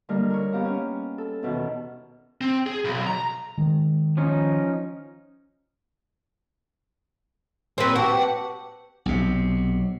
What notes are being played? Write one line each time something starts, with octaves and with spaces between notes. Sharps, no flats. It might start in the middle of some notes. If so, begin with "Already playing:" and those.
D3 G3 A#3 D#4 A#4
A#4 C#5
B3 G4 F5 A#5
C#4
A4
E2 B2 D#3
C4
G#4
B1
A#5
D#3 G#3
F3 C#4 D#4
A#2 C4 B4
F#4 G4 F#5 A5
G4 B4
B1 C3